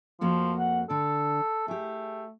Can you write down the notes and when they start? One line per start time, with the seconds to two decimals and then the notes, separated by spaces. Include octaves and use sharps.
0.21 F2 F3 A#3 F#4
0.59 F#5
0.90 D3 A4 D5
1.68 A3 G4 G#4